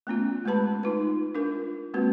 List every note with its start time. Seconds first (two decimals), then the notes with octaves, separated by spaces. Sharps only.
0.07 A3 B3 C#4 F4
0.45 G#3 A3 G4 B4 A5 B5
0.83 D#4 F4 B4
1.35 D4 F4 A#4
1.94 G#3 A#3 C4 F#4 B4